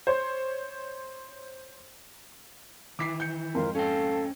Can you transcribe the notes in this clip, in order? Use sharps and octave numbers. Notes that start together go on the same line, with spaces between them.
C5 C#5
D#3 E3 E4 D6 B6 C7
G6 C#7
F2 G#2 A#4 F5 C6
C#4 A4 F5 G5